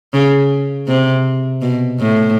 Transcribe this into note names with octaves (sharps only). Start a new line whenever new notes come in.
C#3
C3
B2
A2